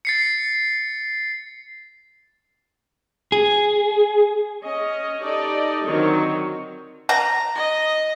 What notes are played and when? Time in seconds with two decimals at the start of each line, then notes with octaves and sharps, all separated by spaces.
0.05 A6 C7 C#7
3.32 G#4
4.63 C#4 C#5 D#5
5.21 D#4 G4 A4 D5 D#5
5.86 D3 D#3 F#3 C4 D#4 C#5
7.09 A#5
7.55 D#5